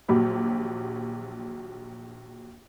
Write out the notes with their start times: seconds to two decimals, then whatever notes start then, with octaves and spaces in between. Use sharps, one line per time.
0.08 A#1 D#2 F#3 G4 B5